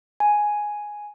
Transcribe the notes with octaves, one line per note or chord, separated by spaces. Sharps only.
G#5